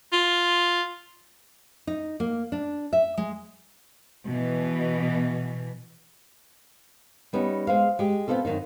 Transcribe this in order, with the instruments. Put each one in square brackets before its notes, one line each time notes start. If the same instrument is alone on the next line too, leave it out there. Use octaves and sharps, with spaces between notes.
[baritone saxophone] F4
[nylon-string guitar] D#4
A#3
D4
E5
G#3
[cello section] B2 E3
[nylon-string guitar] G3 B3 C#4 D#4
G#3 C5 F5
G#3 G4
B3 C4 D4 D#4 F4 A4
F#2 D#3 A#3 D#4